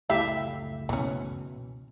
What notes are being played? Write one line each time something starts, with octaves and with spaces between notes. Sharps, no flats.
F#1 C#2 A3 E4 G4 E5 F5
B2 E3 C#4